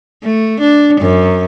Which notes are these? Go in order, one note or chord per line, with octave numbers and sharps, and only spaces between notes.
A3
D4
F#2